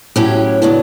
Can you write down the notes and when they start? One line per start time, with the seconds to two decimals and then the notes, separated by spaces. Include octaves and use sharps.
0.16 A2 F#3 C#4 E4 G4
0.62 C#3 F#3 B3 D4